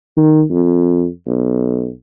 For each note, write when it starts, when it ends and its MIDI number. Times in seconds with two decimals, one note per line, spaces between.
0.17 0.42 51
0.51 1.07 41
1.27 1.90 35